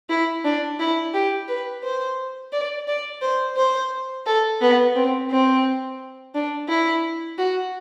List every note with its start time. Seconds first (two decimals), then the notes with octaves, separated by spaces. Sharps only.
0.10 E4
0.44 D4
0.80 E4
1.14 G4
1.48 B4
1.83 C5
2.52 D5
2.88 D5
3.21 C5
3.57 C5
4.26 A4
4.61 B3
4.95 C4
5.31 C4
6.35 D4
6.68 E4
7.38 F#4